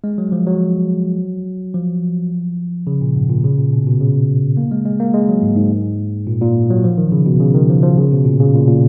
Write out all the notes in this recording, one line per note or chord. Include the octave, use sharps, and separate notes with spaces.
G#3
F#3
F3
F#3
F3
C#3
A#2
G#2
A#2
C#3
A#2
B2
B2
C#3
A#3
G#3
G#3
A#3
G#3
F#3
G#2
G#2
A#2
A#2
F#3
F3
D#3
C#3
B2
C#3
D#3
F3
F3
C#3
B2
A#2
C#3
A#2
A#2